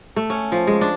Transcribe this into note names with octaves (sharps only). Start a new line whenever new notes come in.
A3
C#4
F3
G#3
D4